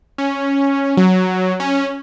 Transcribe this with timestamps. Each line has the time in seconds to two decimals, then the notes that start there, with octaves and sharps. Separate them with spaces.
0.18 C#4
0.97 F#3
1.60 C#4